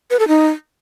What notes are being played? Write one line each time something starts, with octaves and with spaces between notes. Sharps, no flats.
B4
A4
D#4